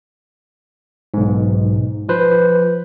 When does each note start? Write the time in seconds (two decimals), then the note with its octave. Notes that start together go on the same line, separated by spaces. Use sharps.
1.14 B1 G#2
2.09 F3 B4 C5